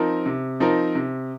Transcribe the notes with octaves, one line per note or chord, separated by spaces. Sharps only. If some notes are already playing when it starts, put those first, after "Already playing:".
Already playing: F3 C4 D#4 A#4
C3
F3 C4 D#4 A#4
C3